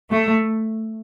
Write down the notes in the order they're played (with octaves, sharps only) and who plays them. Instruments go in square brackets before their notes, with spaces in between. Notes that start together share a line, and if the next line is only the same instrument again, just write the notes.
[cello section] A3